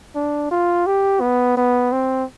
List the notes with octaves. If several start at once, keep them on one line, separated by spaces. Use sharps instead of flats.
D4
F4
G4
B3
B3
C4